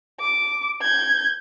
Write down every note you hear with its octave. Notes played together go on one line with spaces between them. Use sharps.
D6
G6 G#6